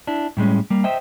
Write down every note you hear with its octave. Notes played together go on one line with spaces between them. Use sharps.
D4 E4
A2 G3 G#3 C#4
G3 A#3
C5 D#5 E5 G5